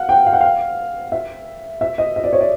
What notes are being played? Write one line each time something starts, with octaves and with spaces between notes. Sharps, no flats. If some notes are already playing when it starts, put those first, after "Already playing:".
Already playing: F5 F#5
G5
F5
F#5
F5
E5
E5
D#5
D#5
D5
C#5
D5